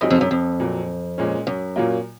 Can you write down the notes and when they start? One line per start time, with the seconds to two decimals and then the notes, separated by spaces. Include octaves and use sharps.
0.01 F#2 F#3 C4 D#4 G#4 D#5
0.10 F2
0.21 F#2
0.31 F2
0.60 A#2 F#3 C4
1.18 A#2 G#3 C#4
1.47 F#2
1.76 A#2 F#3 A#3 F4